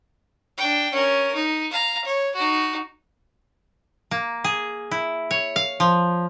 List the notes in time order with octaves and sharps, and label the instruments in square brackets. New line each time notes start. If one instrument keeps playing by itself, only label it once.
[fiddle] D4 G5
C#4 A#4
D#4
F5 A#5
C#5
D#4 F#4
[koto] A#3
G#4
E4
C#5
F5
F3